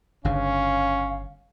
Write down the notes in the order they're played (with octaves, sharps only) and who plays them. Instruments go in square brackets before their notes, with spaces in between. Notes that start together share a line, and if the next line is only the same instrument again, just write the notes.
[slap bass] G1 G2 C#3 [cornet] C#4 [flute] F5